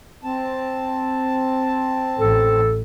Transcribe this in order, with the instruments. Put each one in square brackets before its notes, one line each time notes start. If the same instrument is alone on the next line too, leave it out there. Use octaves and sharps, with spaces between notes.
[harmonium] C4 A5
[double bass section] A1 [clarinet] A4